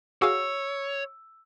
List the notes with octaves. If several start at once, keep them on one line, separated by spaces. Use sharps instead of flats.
F#4 G#4 C#5 F5 E6